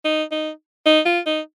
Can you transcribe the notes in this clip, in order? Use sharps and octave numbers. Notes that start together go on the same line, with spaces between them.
D#4
D#4
D#4
F4
D#4